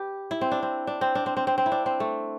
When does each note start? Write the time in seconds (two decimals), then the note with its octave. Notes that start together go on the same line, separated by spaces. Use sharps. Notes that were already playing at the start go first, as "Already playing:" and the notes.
Already playing: G4 B4
0.31 E4
0.41 C4
0.51 D4
0.62 C4
0.87 D4
1.01 C4
1.15 D4
1.26 C4
1.37 C4
1.47 C4
1.58 C4
1.66 E4
1.72 D4
1.86 C4
2.00 A3